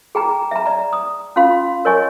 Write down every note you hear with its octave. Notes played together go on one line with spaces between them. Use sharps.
G#4 G5 A#5
E5 A#5
D5 A#5
D#6
C#4 F4 F5 C6
A#4 C#5 D#5 G#5 C#6